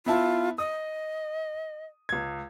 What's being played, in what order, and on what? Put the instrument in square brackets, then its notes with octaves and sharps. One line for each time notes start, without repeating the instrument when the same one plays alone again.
[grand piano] B3 E4 A5 [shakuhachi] F4
[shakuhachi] D#5 [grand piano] D#6
[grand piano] C#2 G#6